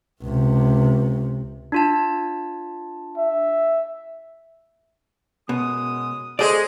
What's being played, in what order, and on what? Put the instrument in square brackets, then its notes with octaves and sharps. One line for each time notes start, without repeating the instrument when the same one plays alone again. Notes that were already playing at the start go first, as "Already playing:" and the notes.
[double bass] C#2 C3
[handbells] D4 F4 A5
[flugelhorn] E5
[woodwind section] F#2 G#3 D#6 [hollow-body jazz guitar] B2
[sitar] G#3 G#4 [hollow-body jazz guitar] A4 C5 D5